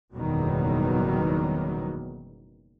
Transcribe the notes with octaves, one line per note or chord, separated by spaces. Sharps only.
F#1 E2 B2 D#3 F#3 G3